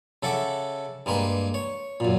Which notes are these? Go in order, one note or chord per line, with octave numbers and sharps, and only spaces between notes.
C#3 A4 E5 F#5 D6
G2 G#3 A#3 B4
C#5
F#2 A#2